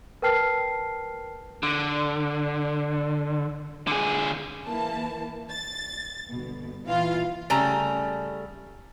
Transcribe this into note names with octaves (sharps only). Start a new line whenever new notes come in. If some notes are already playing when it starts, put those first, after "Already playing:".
A#4 B4 G5 A5 F6 C7
D3
D3 G#4
E3 A#3 A5
A6
G1 B2
A#2 E3 F4 F5
C#3 G3 A3 A#5